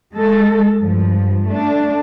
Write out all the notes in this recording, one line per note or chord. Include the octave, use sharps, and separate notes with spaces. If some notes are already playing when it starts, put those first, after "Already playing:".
G#3 A4
G2 F3
A3 D4